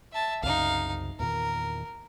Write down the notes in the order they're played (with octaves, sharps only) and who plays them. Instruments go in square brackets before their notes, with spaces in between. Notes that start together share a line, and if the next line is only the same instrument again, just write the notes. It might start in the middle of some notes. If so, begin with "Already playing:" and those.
[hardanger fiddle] E5 A5
[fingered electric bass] C2 F#2 C#3 [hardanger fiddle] D#4 F5
[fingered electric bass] E2 A#2 D#3 [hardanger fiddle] A#4